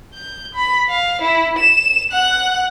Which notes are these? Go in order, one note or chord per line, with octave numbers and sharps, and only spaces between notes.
G6
B5
F5
E4
E7
F#5 F#6